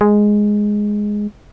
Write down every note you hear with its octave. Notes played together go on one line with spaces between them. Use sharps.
G#3